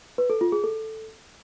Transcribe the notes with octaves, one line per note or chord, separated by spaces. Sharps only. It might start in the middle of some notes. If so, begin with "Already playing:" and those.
B4
A4
F4
G#4
A4